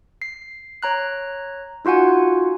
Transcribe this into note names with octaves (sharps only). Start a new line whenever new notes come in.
C7
C#5 A#5 F#6
D#4 F4 F#4 F#5 G#5